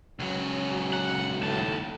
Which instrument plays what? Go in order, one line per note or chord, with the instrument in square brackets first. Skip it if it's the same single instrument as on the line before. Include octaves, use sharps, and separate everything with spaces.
[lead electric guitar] C#2 F#3 [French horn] C#4
[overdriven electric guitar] F#5
[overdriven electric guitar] D#2 A5 [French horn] A2